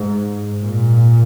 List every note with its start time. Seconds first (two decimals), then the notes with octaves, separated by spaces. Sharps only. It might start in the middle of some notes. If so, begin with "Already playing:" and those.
Already playing: G#2
0.62 A#2